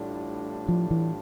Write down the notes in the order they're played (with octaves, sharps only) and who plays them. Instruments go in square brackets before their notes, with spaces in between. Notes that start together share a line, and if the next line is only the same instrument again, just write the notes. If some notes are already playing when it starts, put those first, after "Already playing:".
Already playing: [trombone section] A1 A2 G3 D4 F4
[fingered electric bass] F3
E3